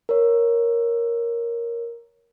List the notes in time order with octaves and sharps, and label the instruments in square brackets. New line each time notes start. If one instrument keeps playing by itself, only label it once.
[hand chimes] A#4 C#5